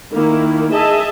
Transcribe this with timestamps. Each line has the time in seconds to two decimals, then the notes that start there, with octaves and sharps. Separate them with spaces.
0.13 D#3 A#3 E4
0.72 G#4 D#5 E5 A5